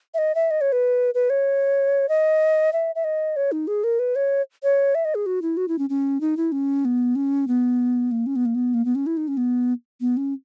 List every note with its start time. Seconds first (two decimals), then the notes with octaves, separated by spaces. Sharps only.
0.14 E5
0.18 D#5
0.35 E5
0.51 D#5
0.61 C#5
0.72 B4
1.14 B4
1.30 C#5
2.09 D#5
2.73 E5
2.95 E5
3.04 D#5
3.36 C#5
3.52 D#4
3.67 G#4
3.84 A#4
3.99 B4
4.16 C#5
4.63 C#5
4.95 E5
5.05 D#5
5.15 G#4
5.26 F#4
5.42 E4
5.57 F#4
5.68 E4
5.79 C#4
5.90 C#4
6.21 D#4
6.37 E4
6.52 C#4
6.85 B3
7.16 C#4
7.48 B3
8.11 A#3
8.26 C#4
8.36 B3
8.45 A#3
8.55 B3
8.74 A#3
8.85 B3
8.95 C#4
9.06 E4
9.17 D#4
9.28 C#4
9.37 B3
10.01 B3
10.17 C#4